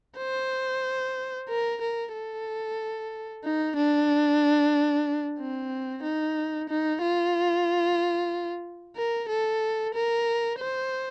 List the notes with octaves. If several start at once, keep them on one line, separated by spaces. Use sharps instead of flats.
C5
A#4
A#4
A4
D#4
D4
C4
D#4
D#4
F4
A#4
A4
A#4
C5